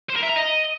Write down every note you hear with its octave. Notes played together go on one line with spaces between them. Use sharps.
C5
A#4
E5
A#5
D#5